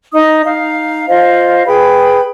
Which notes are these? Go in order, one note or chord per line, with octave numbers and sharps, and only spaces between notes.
D#4 D#5 D#6
D#4 F5
F4 C5 D#5 F5
G#4 B4 G5 B5